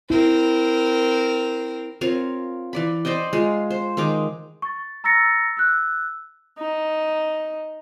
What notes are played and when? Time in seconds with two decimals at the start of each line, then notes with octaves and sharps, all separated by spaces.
0.10 C4 E4 A#4
2.01 C4 F4 A#4 C#5
2.73 E3 D5 B5
3.05 C5 D5 D#5 G5
3.33 G#3 F4 F5
3.70 C5
3.97 D#3 G#3 D#4 D6
4.62 C#6 A6
5.04 A#5 E6 A6 A#6 C#7
5.57 E6 F#6
6.59 D#4